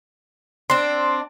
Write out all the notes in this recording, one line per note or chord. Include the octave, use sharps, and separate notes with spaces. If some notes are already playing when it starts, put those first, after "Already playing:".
C4 D4 C6